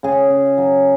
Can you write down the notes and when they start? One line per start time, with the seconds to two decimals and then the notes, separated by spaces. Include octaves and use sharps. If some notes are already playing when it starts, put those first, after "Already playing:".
0.03 C#3 G#4
0.30 C#3
0.58 F#3